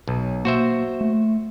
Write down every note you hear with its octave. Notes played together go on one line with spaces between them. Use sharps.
B1
A#3 F#4 C5 E5
A3